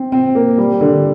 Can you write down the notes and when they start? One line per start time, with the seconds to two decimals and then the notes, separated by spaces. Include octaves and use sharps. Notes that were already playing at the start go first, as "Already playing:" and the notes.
Already playing: C4
0.12 C4
0.35 A#3
0.58 G3
0.81 D3